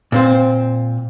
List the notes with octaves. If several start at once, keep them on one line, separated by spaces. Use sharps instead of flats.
A#2 C4 C5